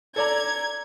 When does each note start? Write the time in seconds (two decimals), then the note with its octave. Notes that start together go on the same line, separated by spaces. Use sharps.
0.16 A4 D5 A#5 G#6